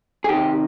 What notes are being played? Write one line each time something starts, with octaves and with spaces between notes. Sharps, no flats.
G#4
C3 D#3 G4